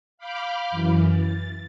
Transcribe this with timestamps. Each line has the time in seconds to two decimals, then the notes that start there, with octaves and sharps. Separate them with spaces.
0.18 F5 B5 D6 F6 G6
0.71 F#2 E3
1.09 A6